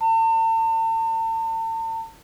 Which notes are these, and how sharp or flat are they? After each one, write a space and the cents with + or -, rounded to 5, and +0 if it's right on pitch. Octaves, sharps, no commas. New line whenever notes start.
A5 +40